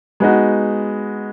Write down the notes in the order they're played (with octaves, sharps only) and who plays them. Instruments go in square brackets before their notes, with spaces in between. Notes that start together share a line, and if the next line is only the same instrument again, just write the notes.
[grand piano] G#3 B3 D#4 F#4